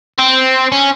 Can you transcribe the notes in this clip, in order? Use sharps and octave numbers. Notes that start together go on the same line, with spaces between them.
C4
C#4